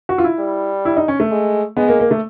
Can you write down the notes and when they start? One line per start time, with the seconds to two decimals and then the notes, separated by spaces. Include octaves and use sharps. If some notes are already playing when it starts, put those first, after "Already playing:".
0.09 F#4
0.18 F4
0.24 E4
0.39 G3
0.85 E4
0.97 D#4
1.08 C#4
1.20 A3
1.31 G#3
1.77 G#3 B3
1.88 A#3
2.00 A#3
2.11 A3